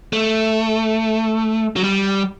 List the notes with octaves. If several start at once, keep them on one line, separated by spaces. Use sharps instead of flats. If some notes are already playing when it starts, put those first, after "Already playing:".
A3
F#3
G3